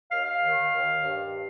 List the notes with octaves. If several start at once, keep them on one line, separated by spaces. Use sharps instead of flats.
D#2 F5
F5
D#3
D#2
G2